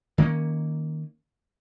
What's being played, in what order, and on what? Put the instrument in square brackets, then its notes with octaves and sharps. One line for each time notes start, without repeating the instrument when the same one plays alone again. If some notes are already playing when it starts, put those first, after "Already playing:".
[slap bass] D#3 A#3 B3 C#4